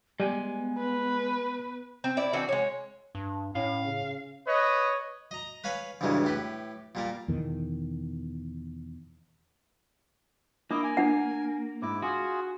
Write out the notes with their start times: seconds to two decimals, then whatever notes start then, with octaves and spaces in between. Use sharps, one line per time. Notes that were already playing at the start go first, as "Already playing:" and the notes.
0.20 G3 G#3 B3 G#5
0.78 B4
2.04 C4
2.17 E4 D5
2.33 E3 C4 D4 F#4
2.49 G#3 C#5
3.15 G2
3.55 A2 C#4 F5
3.85 C#3
4.47 B4 C#5 D#5
5.31 D#5 A#5
5.64 B4 C#5 F5 G#5 B5
6.01 A1 D2 G2 C#3 E3 G#3
6.24 A2 G4 B4
6.95 A#2 G3 A#3
7.28 E2 B2 D#3
10.71 A#3 D4 E4 D#5 D6
10.84 G#5
10.97 D4 F#5
11.82 G#2 E4 D6
12.02 F4 F#4 G#4